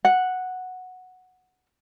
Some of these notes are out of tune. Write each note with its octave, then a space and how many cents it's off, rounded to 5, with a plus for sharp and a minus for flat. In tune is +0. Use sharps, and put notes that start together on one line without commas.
F#5 -5